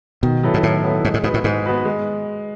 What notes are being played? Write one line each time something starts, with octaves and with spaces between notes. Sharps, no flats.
B2 D#3
F#3 B3 E4 A4
G#2
A2 D#3
F#3 B3 E4 A4
G#2 G#3
A2
G#2 B3 F#4 B4
A2
G#2 G#3
B3 F#4 B4
G#3